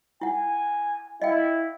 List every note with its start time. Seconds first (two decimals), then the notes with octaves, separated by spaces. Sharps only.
0.21 E4 F#5 G#5
1.22 E4 D#5 F5 G5